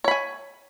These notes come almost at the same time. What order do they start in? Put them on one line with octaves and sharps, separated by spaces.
C#5 B5 G#5